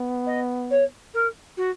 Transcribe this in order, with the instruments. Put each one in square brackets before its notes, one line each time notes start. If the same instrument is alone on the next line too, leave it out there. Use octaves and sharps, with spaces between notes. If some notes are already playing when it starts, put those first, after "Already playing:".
Already playing: [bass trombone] B3
[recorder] D#5
C#5
A#4
F#4